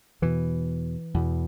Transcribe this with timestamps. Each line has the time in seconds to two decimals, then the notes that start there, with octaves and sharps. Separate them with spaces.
0.22 E2 B2 E3
1.14 E2 B2